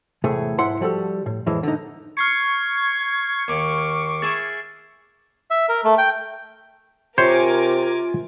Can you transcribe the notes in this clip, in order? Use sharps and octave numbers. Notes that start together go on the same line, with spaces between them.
E2 A2 C3 A3 G#4
B1 G#2 E4 F#5 C6
F3 G3 F#4 A4
A2
F2 A2 E3 G#3
D3 D#4
C#6 F6 G#6 C7 C#7
D#2 D6
E4 G#4 A6
E5
A#4
A3
G5
C3 F4 A#4 C5 C#5 G#5 D6